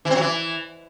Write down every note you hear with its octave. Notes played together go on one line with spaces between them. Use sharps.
E3
C4
F#3
E3